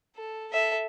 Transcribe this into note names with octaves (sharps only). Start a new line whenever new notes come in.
A4
A4 E5